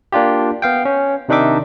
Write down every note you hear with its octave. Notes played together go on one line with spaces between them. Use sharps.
A#3 D4 F4 G4
B3 F5 G5
C#4
C3 D#3 D4 D#4 E5 D6